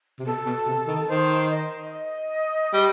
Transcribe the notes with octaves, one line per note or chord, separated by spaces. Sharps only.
C3
B2 A4
B2
C3
D#3
D#3 C5
D#5
G3